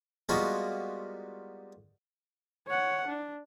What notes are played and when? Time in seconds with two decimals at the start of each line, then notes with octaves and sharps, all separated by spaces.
0.29 G3 G#3 A#3 B3 F4 F#4
2.67 C#5 F#5
3.07 D4